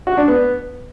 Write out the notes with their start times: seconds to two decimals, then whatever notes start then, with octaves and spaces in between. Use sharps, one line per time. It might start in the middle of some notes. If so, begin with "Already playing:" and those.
0.07 F#4
0.17 D4
0.28 B3